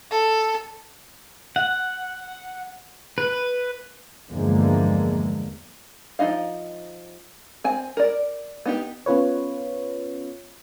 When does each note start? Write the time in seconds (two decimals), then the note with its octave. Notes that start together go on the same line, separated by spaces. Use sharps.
0.11 A4
1.56 F#5
3.18 B4
4.30 E2 G2 D3 F3 G#3 A#3
6.19 F3 F#3 D#4 D#5 F5
7.64 C4 G#5
7.97 A#4 D5
8.66 B3 D#4 G4
9.06 B3 C#4 F4 B4 C#5